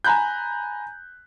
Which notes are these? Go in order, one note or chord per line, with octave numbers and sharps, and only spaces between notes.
G#5 A#5 B5 F#6 G6